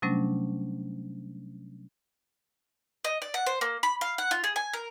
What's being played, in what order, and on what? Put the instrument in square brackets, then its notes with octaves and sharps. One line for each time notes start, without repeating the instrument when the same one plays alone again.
[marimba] C3 F#3 G3 A3 C#4 D4
[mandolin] D#5
D5
F#5
C5
A#3
B5
F5
F#5
F4
G#4
G#5
A#4